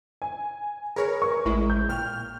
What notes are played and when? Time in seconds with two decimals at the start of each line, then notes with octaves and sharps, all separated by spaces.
0.22 G#5
0.96 G#4 A#4 B4 C#5
1.22 C#6
1.45 A1 G#3 E4
1.70 G6
1.89 A#2 G5 F6